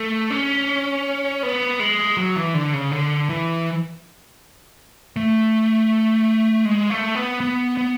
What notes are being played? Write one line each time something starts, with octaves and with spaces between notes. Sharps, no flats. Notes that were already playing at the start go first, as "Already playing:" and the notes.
Already playing: A3
C#4
B3
G#3
F#3
E3
D3
C#3
D3
E3
A3
G#3
A3
B3
B3
B3